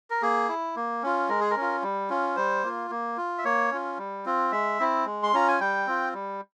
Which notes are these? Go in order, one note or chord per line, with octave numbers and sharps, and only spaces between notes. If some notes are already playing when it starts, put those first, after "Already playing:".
A#4
A#3 G#4
E4
A#3
C#4 F4
G#3 A#4
G#4
A#4
C#4 F4
G3
C#4 F4
G3 C5
A#3 F4
A#3
F4
E5
A#3 C#5
C#4 F4
G3
C4 F4
G#3 E5
C4 E4
G#3
C6
C#4 F4 A#5
G#5
G3 G5
C4 F4
G3